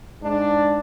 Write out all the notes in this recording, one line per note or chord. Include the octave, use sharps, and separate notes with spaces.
G#2 D4